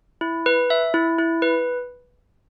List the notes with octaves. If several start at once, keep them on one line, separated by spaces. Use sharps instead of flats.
E4
B4
E5
E4
E4
B4